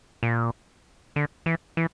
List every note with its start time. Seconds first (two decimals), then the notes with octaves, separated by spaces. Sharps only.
0.23 A#2
1.16 D3
1.46 E3
1.77 E3